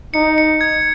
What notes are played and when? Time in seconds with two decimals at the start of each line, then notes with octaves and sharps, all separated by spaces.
0.14 D#4 C#7
0.38 C#7
0.61 G#6